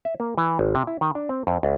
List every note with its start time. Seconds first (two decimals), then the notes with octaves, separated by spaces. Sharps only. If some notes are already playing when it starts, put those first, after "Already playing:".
0.05 E5
0.20 A#3
0.38 E3
0.59 G#1
0.75 C3
0.87 E4
1.01 D#3
1.15 D4
1.29 C4
1.47 F2
1.63 C#2